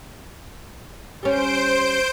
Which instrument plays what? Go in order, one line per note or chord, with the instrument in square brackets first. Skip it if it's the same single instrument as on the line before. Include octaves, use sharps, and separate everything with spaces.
[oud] G3 C#4 [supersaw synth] C5 G6 D7